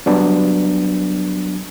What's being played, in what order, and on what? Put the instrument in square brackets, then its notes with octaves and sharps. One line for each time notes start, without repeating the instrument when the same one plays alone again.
[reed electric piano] F#3 G3 B3 D4